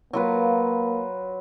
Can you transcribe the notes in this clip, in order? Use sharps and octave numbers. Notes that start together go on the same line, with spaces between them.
F#3 A#3 F4 B4